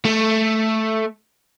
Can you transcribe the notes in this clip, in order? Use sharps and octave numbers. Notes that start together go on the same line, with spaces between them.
A3